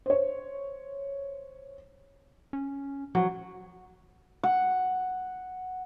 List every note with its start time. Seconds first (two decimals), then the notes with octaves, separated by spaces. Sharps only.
0.06 C5 C#5
2.53 C#4
3.15 F3 F#3
4.43 F#5